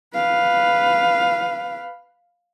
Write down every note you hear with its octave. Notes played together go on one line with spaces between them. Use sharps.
B4 F5